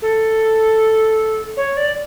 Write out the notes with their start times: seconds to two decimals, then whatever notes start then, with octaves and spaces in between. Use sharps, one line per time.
0.02 A4
1.57 C#5
1.77 D5